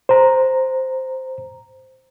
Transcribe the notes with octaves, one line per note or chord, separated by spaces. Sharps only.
C5 A#5